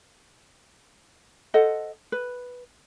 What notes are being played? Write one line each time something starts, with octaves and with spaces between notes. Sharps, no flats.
A4 C5 D#5 F#5
B4